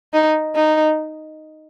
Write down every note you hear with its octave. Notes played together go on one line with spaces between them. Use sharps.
D#4
D#4